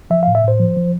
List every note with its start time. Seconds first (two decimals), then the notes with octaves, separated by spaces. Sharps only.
0.10 F3 E5
0.23 F5
0.28 A2
0.35 E5
0.44 A2 C5
0.59 F3
0.77 F3